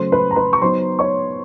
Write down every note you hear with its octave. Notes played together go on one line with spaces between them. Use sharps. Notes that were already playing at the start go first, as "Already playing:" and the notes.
Already playing: C#3 F#3 A3 C5 C6
B4 B5
A#5
B4 B5
C#6
F#3 B3 D#4 C5 C6
C#5 C#6